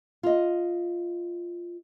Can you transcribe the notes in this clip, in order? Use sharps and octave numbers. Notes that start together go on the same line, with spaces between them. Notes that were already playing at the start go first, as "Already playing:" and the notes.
F4 D#5